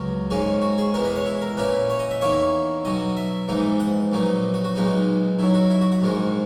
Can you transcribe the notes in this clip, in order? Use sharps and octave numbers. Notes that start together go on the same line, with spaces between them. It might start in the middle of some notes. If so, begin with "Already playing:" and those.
Already playing: C#2 B2 F#3 A#4
G#2 D#3 A#3 C#4 G#4
F#4
G#4
E2 B2 G#3 B3 A#4
B4
C#5
E4
A#4
A#2 A#3 C#4 E4 B4
C#5
D#5
E5
E2 D#3 A#3 E4 C#5
B1 B2 F#3 D#5
E5
A#1 G#2 E3 B3 D#4
F#5
A#1 A#2 F#3 B3 D#4
F#4
F#4
B1 A#2 G#3 B3 D#4
F#2 D#3 F#3 E4
F#4
E4
F#4
F#4
A#1 G#2 D#3 G#3